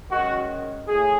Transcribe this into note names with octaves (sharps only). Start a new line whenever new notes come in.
F#2 D#3 G#3 F#4
A2 G#4